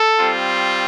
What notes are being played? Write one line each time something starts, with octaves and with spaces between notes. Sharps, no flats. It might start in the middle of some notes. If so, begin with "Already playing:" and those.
Already playing: A4
G3 C4 F4